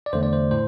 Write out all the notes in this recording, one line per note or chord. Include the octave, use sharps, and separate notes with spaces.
D5
E2 D3 A3 C5
D5
C5
A2 C5